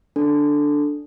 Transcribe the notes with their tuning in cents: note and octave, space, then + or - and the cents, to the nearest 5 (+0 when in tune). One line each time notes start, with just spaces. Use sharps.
D4 +0 A4 +0